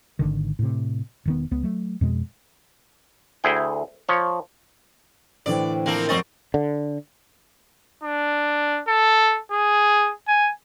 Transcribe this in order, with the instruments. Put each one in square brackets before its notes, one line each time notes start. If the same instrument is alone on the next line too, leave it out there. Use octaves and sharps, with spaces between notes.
[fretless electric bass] G#1 C#2 D3 D#3
A2 C3
E1 D#3 B3
C#2 B3
F#3 A3
F2 B2 G#3
[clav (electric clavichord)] D2 E4 G#4 G5
F3 C#5
[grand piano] A2 D3 E3 [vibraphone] C5 G5 [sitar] D5
[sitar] F3 A#3 C4 [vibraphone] A#4
[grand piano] F2 C#6 A6 [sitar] F#3 C4 D#5
[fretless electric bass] D3
[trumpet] D4
A4
G#4
G#5